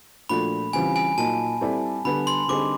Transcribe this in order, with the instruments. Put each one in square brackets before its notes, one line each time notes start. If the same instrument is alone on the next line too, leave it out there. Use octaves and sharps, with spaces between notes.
[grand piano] A#2 F3 A3 D4 F#4 [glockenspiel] B5
[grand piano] C#3 E3 G3 C4 F4 [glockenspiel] G#5
[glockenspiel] G#5
[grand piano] A#2 F#3 A#3 D#4 [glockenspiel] A5
[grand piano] G3 C4 E4 A4 D5
[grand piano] D3 G3 B3 [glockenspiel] B5
[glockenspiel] C6
[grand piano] D3 G3 C4 D#4 G#4 [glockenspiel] D6